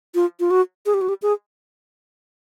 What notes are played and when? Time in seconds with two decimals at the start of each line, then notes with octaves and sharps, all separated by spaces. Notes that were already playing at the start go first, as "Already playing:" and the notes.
0.15 F4
0.40 F4
0.51 F#4
0.86 G#4
0.94 G4
1.01 F#4
1.09 G4
1.22 G#4